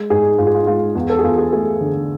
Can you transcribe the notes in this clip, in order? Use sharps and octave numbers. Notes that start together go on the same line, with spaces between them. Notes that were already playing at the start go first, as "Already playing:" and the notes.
Already playing: G#3
G#2 G#4
G#2 F4
G#4
F4
G#3 F4
E2
A4
G#4
E2 F4
G#4
A3 G#4
D3